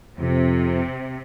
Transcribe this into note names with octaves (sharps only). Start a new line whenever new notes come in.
F2 C3